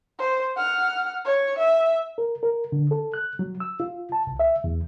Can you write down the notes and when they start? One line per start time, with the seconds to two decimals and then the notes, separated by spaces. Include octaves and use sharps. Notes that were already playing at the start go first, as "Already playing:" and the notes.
0.18 C5
0.56 F#5 F6
1.25 C#5
1.59 E5
2.18 A#4
2.43 A#4
2.72 D3
2.91 A4
3.14 F#6
3.39 F#3
3.60 E6
3.80 F4
4.12 A5
4.27 C2
4.40 E5
4.64 E2